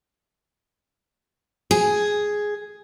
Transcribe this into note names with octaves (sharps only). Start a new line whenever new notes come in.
G#4